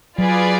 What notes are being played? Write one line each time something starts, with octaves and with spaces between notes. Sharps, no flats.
F#3 F4 G#4 B4 D5 G#5